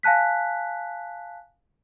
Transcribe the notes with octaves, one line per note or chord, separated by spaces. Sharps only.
F5 G#5 A5 F#6 B6